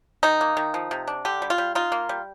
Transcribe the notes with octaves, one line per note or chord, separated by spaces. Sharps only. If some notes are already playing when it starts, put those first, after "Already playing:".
D#3 D#4
A#3
D#3
F3
C3
D4
D3 G4
G3
F4
G3
D#4 F4
A#3
G3